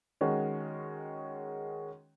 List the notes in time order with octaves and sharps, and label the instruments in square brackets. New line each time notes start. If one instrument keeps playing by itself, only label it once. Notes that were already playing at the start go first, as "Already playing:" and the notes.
[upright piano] D#3 G#3 C#4 F#4